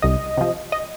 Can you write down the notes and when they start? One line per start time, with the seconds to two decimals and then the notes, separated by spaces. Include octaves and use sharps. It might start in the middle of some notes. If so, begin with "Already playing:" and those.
0.02 C2 D#5
0.37 C3 F3
0.72 D#5